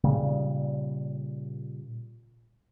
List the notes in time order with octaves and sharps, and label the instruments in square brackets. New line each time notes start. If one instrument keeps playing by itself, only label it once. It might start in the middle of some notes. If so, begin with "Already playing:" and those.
[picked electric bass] A#2 C#3 G3